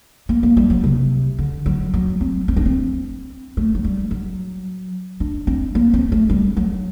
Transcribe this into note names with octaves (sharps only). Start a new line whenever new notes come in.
A#3
A#3
G3
F#3
C3
D3
F#3
F#3
C4
C4
D4
C4
A3
F#3
G3
F#3
D4
C4
A#3
C4
A3
G3
F#3